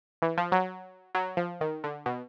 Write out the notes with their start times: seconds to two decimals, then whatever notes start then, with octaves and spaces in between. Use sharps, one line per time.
0.22 E3
0.38 F3
0.52 F#3
1.15 F#3
1.37 F3
1.61 D#3
1.84 D3
2.06 B2